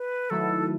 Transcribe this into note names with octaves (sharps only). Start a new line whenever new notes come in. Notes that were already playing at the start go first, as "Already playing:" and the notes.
Already playing: B4
D#3 F#3 A3 E4 A4